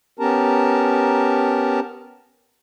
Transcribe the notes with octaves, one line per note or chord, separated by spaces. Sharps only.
B3 C#4 G4 A#4 A5 A#5